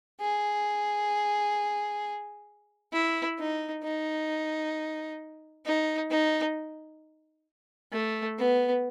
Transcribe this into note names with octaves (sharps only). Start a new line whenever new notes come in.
G#4
E4
D#4
D#4
D#4
D#4
A3
B3